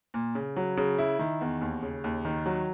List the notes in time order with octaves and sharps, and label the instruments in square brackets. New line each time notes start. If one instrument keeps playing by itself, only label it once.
[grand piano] A#2
C#3
F#3
C#3
E4
D#3
E2
D#2
C#3
D#2
D#3
F#3